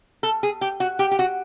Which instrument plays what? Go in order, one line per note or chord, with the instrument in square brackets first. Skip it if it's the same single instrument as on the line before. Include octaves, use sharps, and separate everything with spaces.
[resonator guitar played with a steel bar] A4
G#4
G4
F#4
G4
G4
F#4